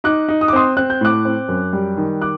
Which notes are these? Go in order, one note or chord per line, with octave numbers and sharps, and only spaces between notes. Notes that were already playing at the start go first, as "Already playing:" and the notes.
D#4 D6 F#6
D#4
D#6
D6
C4 C6 D#6
C4 F#6
G6
A2 D6 F#6
C4
F#2
G3
D#3
D6 F#6